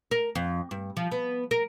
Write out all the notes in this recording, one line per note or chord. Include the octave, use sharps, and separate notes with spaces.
A#4
F2
G2
F3
B3
A#4